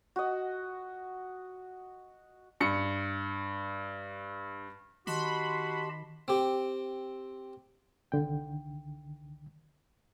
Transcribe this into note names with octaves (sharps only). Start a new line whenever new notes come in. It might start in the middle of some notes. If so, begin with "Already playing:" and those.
F#4 D#5
G2 C#7
D#3 F#4 G4 D#5 A5 B5 C6
C4 G4
C2 D3 D#3 G5